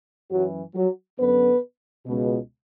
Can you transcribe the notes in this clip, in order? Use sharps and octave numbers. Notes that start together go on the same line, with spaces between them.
F#2 E3 F#3 F#4
F#3 F#4
F#2 D3 B3 B4
C#2 B2